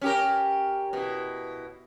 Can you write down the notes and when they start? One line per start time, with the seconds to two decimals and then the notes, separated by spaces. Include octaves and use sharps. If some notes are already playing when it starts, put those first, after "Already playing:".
0.01 C#4 G4 A#4
0.93 B2 E4